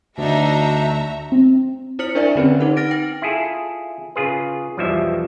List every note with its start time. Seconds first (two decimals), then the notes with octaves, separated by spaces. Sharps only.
0.18 D2 D4 D#4 F#4 E5 A#5
1.32 C4
1.99 E4 C5 F6 C#7 F#7
2.15 D4 A#4 D5 E5 G#5
2.36 D3 C4 C#4 B4
2.60 D#4 F#5
2.77 F6 A6 A#6 D7
2.91 G5
3.22 E4 F4 G#4 A4
4.16 C#3 F4 G#4 B4
4.77 B1 E2 B2 F3 G3 E5